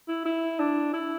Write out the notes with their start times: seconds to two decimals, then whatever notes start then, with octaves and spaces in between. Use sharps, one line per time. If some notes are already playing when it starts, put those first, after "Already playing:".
0.08 E4
0.25 E4
0.59 D4
0.93 E4